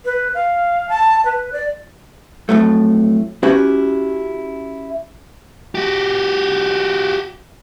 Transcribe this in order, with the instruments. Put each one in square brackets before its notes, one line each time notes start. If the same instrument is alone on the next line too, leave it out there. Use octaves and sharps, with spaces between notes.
[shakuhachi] B4
F5
A5
B4
D5
[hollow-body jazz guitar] F2 A2 F#3 A3
C#4 E4 F#4 G4 B4
[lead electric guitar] F#4 G4